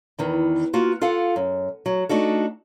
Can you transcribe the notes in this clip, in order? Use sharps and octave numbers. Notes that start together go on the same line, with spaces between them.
E2 D#3 E3
A#3 F4 F#4
F4 A4 F5 F#5
F#2
F#3
A3 D4 D#4 F#4 A4